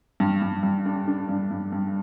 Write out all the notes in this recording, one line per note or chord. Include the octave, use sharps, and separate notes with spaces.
G2
G2
G2
D4
D4
G2
G2
G2